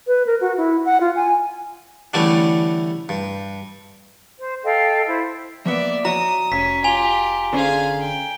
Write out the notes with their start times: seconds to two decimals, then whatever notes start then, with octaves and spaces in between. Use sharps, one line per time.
0.07 B4
0.27 A#4
0.41 F#4
0.57 E4
0.85 F#5
1.01 F4
1.16 G#5
2.14 D3 E3 G3 A3 C#4
3.09 G2
4.39 C5
4.64 A4 D#5 F5 G5
5.07 E4 C5
5.66 F3 A#3 B3 D5 E5
6.05 F#4 C#5 E5 A#5 D#6
6.52 F1 C#4 B6
6.84 F4 G4 G#5 F7 G7
7.53 D3 C#4 G#4 C5 F5
8.01 G5